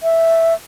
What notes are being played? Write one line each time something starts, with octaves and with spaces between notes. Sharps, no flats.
E5